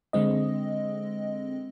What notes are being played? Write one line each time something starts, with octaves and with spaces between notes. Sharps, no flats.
D3 G#3 C4 D#5